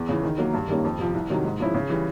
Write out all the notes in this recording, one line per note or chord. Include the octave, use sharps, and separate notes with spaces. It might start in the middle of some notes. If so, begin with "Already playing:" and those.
Already playing: E2
C#3 E3
D#3
F#3 A#3
G2
D#3 G3 A#3 C#4
F2
C3 F3
C2
C3 D#3 F#3
G#2
F3 G#3 C#4 E4
C#3
E3 G3